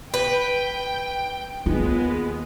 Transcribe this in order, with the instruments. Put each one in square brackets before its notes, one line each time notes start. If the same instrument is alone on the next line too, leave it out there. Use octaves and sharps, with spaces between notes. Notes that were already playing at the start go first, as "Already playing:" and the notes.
[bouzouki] B4 [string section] G5
[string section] D#2 G#3 B3 [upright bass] F4